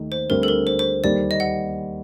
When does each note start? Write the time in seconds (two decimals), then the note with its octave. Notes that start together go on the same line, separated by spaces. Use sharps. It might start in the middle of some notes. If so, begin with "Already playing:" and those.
Already playing: D#2 D#3 A3 D#4
0.12 C5
0.30 D2 D3 G3 C4 A#4
0.43 A4
0.48 A#4
0.67 C5
0.79 C5
1.04 D#2 D#3 G3 D5
1.31 D#5
1.40 F#5